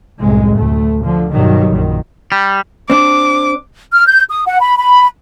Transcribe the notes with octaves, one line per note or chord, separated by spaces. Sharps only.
C2 F#2 A2 C3 G#3
D2 A3
D3 F3
G2 B2 D#3 F#3 G3
A#1 F#2 D#3
G3
C4 D4 D6
F6
G6
D#6
F#5
B5
B5